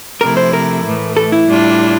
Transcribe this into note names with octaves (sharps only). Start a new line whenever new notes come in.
C3 F3 A3 E4 A#4
C5
A#4
A2 E3 A3
A4
E4
A2 G3 D4 F4